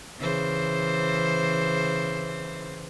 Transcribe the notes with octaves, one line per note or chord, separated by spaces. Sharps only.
C#3 E3 C5